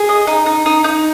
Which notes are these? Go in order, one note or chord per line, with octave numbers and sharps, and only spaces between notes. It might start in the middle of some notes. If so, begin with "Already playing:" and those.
Already playing: G#4
D#5
D#4
D#4
D#4
D#4